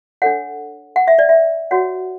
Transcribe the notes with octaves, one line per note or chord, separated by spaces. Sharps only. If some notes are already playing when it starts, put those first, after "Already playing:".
D4 A4 C#5 F#5
F#5
E5
D5
E5
F#4 C#5 F#5